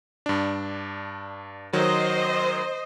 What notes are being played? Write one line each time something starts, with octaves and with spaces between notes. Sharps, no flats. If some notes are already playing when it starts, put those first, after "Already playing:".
G2 D4
D#3 F#3 C5 D#5